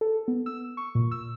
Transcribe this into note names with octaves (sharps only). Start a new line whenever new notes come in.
A4
B3
E6
C#6
A#2
E6